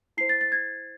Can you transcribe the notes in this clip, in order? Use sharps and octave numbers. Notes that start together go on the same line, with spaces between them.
E4 C5 C7
A6
A6
G#6